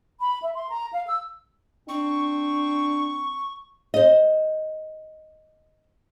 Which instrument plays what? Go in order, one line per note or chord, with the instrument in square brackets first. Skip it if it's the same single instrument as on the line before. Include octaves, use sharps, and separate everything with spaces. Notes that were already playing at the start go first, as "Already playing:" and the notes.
[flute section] B5
E5
C6
A#5
F5
E6
[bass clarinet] C4 [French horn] D4 [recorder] C#6
[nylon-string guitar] C5 D#5